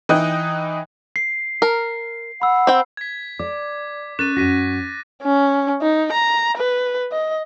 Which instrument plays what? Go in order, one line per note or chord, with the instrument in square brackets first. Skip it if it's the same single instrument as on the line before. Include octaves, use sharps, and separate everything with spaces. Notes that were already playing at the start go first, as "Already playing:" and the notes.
[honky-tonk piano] E3 D#4 D#5 G5 F#6
[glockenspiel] C7
[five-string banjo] A#4
[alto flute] F#5 [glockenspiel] B5 E6
[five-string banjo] C4 G5
[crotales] G#6 B6
[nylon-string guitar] D5 [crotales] D6
[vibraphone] C#4 [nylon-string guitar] A#4 [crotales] F#6 A6 D#7
[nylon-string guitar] F#2 F#4 [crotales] A#6 B6 D#7
[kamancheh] C#4
D#4
A#5
B4
D#5